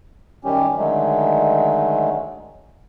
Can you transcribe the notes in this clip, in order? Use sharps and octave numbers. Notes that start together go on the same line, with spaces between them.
F#2 D#3 G3 C#4 G4
D3 D#3 F#3 G#3 A3